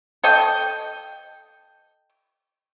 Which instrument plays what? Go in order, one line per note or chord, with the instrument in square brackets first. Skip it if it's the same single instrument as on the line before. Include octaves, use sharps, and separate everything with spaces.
[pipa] A4 D#5 G5